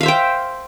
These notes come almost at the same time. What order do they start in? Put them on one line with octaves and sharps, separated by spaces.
F5 E5 C5 G5